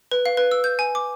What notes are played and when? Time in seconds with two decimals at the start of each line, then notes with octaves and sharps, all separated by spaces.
0.12 B4
0.26 F5
0.37 B4
0.51 E6
0.64 G6
0.79 G#5
0.95 D6